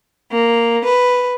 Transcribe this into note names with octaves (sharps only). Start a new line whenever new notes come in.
A#3
B4